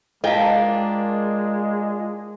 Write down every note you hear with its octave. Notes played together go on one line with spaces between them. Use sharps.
G#3 A#3 D4 F4 A#4 D#5 F5 G5